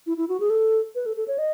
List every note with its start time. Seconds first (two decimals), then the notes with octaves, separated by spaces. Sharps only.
0.07 E4
0.17 E4
0.29 F#4
0.40 G#4
0.50 A4
0.95 B4
1.06 A4
1.17 A4
1.28 C#5
1.38 D#5